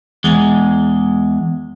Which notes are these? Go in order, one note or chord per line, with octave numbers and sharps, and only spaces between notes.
E2 G#3